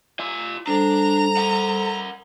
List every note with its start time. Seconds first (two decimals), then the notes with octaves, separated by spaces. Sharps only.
0.20 F4 G#5
0.67 G3 D4 A4 C5 A#5
1.37 A#4 F#5